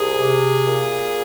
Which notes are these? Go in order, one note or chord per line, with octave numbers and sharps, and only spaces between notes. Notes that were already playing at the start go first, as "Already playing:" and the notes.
Already playing: C2 G#4
C3
A#2